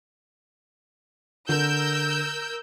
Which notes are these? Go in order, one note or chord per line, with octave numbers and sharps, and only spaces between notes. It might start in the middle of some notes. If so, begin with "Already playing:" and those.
D3 A#4 E6 G6